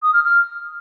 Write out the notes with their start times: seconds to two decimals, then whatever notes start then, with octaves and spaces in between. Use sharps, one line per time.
0.02 D#6
0.13 F6
0.24 F6